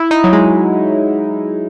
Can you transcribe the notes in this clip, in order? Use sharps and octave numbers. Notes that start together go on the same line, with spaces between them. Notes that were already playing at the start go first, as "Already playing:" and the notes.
Already playing: E4
D#4
F#3
G#3